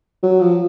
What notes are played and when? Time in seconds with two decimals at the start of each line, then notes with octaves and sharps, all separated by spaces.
0.23 F#3
0.41 F3